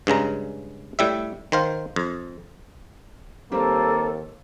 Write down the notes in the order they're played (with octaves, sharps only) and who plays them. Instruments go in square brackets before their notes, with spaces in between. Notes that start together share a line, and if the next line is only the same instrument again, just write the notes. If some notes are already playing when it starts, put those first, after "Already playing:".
[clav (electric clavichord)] G2 C#3 G#3 A#5
A2 G3 E5
D#3 C5 F5
F2
[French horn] D#2 [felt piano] G3 C4 [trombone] A#3 [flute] A4